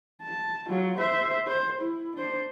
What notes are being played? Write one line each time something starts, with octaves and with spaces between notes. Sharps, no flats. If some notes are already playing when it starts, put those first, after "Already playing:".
A5
F#3 F4
C5 E5
C5
E4
D4 C5